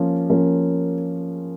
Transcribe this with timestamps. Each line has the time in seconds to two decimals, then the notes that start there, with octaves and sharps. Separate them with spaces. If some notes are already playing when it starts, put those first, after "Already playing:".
Already playing: F3 A#3 C#4
0.30 F3 A#3 C#4